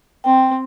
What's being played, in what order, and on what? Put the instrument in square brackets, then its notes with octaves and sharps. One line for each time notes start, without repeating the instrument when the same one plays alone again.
[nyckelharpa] C4 [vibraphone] G5